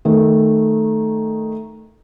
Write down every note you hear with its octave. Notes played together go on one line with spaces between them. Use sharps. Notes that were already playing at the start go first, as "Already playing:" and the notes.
D#3 A3